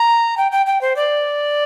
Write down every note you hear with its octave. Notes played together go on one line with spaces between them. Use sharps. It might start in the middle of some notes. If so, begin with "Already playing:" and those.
Already playing: A#5
G5
G5
G5
C5
D5